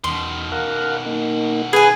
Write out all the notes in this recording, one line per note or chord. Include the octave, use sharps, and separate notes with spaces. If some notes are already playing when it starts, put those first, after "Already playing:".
E2 B2 D#3 C6
A#4 F5 F#5
A#3 D#4
G#4 B4 G#5